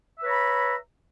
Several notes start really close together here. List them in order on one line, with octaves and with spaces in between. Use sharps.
E5 B4 C#5 A#5 B5